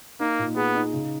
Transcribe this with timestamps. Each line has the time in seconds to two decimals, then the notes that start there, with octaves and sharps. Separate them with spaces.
0.20 A#3 D#4
0.39 A#2
0.56 B3 G#4
0.75 D#4
0.93 C#3